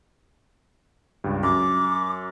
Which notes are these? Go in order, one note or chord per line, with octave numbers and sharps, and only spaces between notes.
C#2 G2
F#2 D6